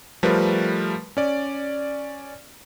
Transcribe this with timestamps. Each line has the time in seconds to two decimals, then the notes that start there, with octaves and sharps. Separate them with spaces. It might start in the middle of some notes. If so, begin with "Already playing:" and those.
0.23 F3 G3 A3 A#4 B4
1.17 C#4 D5